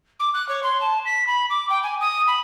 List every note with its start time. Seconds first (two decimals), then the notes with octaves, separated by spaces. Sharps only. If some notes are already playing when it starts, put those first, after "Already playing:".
0.20 D6
0.34 F#6
0.49 C#5
0.63 C6
0.81 A5
1.05 B6
1.27 B5
1.50 D6
1.70 G5
1.83 G#5
2.01 D#6
2.27 B5